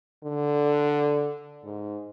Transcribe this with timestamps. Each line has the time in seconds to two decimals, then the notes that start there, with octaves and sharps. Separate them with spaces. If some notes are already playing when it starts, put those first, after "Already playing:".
0.24 D3
1.64 G#2